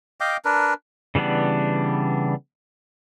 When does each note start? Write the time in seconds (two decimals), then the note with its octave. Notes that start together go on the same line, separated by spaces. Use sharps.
0.20 D#5 F5 G5 D6
0.45 D4 A#4 B4
1.15 C#3 E3 G3 B3 D4